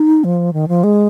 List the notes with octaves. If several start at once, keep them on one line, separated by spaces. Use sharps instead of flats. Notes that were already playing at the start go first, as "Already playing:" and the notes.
Already playing: D#4
F3
D#3
F3
G#3